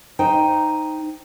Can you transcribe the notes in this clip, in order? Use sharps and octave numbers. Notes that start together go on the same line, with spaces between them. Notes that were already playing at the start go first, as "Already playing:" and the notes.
D#4 C5 G5